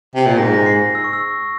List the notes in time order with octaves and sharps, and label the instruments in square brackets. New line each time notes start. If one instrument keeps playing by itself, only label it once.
[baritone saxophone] C3
A#2
[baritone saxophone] G#2 [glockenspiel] A#6
[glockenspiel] A#6
C7
E6
C#6
E6